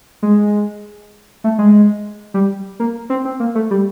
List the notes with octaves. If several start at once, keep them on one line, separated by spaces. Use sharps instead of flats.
G#3
A3
G#3
G3
A#3
C4
C4
A#3
A3
G3